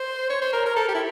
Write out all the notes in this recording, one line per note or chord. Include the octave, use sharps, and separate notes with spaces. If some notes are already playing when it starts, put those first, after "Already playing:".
Already playing: C5
C#5
C5
A#4
A#4
A4
G4
E4